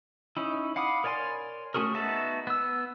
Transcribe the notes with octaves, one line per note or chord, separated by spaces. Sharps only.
C#4 D#4 E4
F5 F#5 B5 D6 D#6
A#4 C#5 D5 G#5 C6
A3 C#4 F#4 G#4 A#4
B3 D#4 F#4 E5 A5
B3 E6